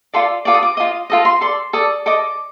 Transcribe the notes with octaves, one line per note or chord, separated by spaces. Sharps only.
F4 A4 D5 C6
F4 A4 D5 D6
D#6
D6
F4 A4 D#5 D#6
F4 A4 D#5
C6
A4 D5 C6
A4 D5 D#6
A4 D#5 D6